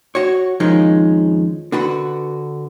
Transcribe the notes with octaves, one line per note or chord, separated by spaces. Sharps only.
F#4 C#5
F2 D#3 F3 G#3 C#4 D#4
D3 F#4 B4